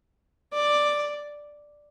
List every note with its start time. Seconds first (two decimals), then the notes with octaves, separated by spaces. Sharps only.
0.53 D5